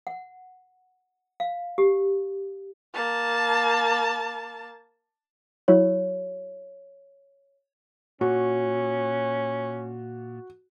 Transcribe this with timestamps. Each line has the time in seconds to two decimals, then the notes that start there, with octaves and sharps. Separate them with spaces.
0.07 F#5
1.40 F5
1.78 G4
2.93 A#3 A5
5.68 F#3 E4 F#4 C#5
8.21 A#2 C#4 F#4